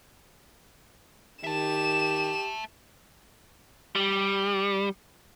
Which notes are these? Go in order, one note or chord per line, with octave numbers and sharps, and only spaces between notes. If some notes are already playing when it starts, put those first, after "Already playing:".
D#3 G4 E5 A5 E7
G3